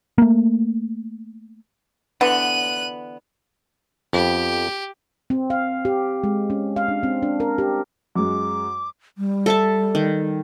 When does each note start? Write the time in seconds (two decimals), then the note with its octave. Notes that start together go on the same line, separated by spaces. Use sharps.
0.18 A3 A#3
2.21 D3 E3 B3 F#6 D#7
4.13 F2 B3 G4
5.30 C4
5.50 F5
5.85 G4
6.24 G#3
6.50 C#4
6.76 F5
6.88 D4
7.03 C4
7.23 D4
7.40 A#4
7.58 G4
8.16 F#2 G#3 D6
9.18 G3
9.46 A4 E5 A5
9.95 D#3